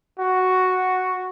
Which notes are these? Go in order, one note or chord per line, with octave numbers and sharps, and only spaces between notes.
F#4